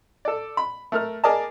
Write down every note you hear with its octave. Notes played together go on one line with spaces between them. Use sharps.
A4 D5
B5
A3 A#4 F6
G#4 A#4 D5 D#5 A5